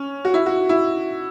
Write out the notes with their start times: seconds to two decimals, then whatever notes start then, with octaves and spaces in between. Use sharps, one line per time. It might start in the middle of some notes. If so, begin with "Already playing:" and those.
Already playing: C#4
0.25 F#4
0.34 E4
0.46 F#4
0.69 E4